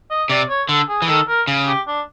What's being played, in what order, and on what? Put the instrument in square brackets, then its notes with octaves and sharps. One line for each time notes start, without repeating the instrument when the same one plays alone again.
[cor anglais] D#5
[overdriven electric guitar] C3 [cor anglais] D5
[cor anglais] C#5
[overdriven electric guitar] D3 [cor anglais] A4
[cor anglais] G#4
[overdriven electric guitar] E3
[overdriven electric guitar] D#3 [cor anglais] A4
[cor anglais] A#4
[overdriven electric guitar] C#3
[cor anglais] G4
D4